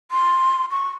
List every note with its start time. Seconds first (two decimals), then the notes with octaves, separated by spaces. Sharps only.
0.11 C6
0.71 C#6